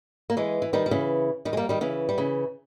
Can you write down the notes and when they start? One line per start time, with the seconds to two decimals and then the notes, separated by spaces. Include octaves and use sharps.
0.30 A#3
0.37 E3 G#3
0.62 E3
0.73 D#3 G3
0.86 G3
0.91 C#3 E3
1.45 D#3 G3
1.53 G#3
1.57 G3 A#3
1.69 D#3 G3
1.81 C#3 E3
2.09 G3
2.18 C#3 E3